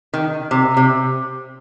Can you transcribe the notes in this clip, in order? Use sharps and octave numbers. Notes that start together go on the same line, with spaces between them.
D#3
C3
C3